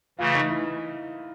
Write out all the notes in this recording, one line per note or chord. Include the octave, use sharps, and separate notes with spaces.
C#3 E3 A3 F4
D#4
E4